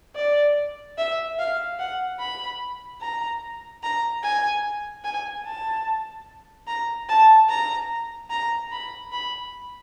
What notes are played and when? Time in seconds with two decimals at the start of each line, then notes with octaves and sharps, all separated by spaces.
0.16 D5
0.98 E5
1.39 F5
1.79 F#5
2.20 B5
3.01 A#5
3.83 A#5
4.23 G#5
5.04 G#5
5.46 A5
6.67 A#5
7.09 A5
7.49 A#5
8.30 A#5
8.72 B5
9.12 B5